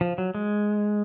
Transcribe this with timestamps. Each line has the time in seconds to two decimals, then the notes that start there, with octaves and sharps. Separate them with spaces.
0.01 F3
0.18 F#3
0.35 G#3